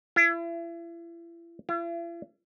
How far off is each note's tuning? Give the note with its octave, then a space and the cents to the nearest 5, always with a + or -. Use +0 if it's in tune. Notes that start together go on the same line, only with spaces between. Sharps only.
E4 +35
E4 +45